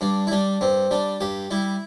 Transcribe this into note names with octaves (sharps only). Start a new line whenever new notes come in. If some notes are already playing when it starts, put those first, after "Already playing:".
G2 D4
E4
G3 D4
G2 C4
G3 D4
G2 G4
G3 E4